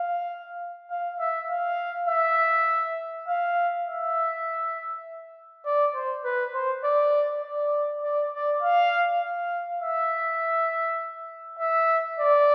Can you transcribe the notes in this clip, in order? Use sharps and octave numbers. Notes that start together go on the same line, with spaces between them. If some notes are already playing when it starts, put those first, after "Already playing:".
Already playing: F5
F5
E5
F5
E5
F5
E5
D5
C5
B4
C5
D5
D5
D5
D5
F5
F5
E5
E5
D5